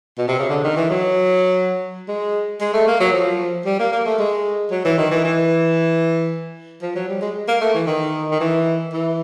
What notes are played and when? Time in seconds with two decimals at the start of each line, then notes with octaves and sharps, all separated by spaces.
0.18 B2
0.28 C3
0.39 C#3
0.50 D3
0.63 D#3
0.77 E3
0.90 F#3
2.08 G#3
2.61 G#3
2.73 A3
2.87 A#3
3.00 F#3
3.13 F3
3.66 G3
3.79 A#3
3.92 A#3
4.06 A3
4.19 G#3
4.71 F#3
4.85 E3
4.98 D#3
5.11 E3
5.24 E3
6.82 F3
6.95 F#3
7.08 G3
7.21 G#3
7.48 A#3
7.61 A3
7.74 E3
7.87 D#3
8.31 D#3
8.40 E3
8.93 E3